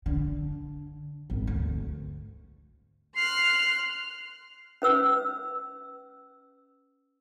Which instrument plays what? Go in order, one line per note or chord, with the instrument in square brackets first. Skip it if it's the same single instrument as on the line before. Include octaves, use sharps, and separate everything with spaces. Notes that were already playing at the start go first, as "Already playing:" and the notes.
[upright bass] D3
G#1
D2
[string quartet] C6 F6 F#6 [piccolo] C7
[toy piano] C#4 B4 E6